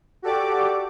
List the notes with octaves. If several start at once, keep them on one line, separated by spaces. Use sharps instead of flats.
F#4 G4 A4 D5 D6